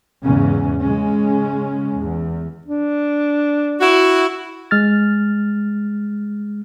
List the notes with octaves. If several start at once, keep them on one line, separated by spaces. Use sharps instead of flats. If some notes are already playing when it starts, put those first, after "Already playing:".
E2 G#2 C#3 C#4
C#3 G#3 C#4
E2
D4
E4 F#4
G#3 F6 A6